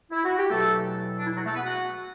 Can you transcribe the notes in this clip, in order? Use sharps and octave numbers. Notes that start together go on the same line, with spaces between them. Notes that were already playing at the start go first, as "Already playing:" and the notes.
E4
F#4
G4
E2 B2 F#3 A3 A4
D4
E4
F#3 F#4
A3 A4
B3 B4
F#4 F#5